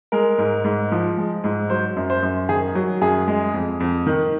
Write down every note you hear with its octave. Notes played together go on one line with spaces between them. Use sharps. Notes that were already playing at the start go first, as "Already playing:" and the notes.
G#3 A#4
G#2
G#2
F3
G#3
G#2
F#3 C5
F#2
C5
F#2
D#3 G#4
F#3
F#2 G#4
G#3
F2
F2
D#3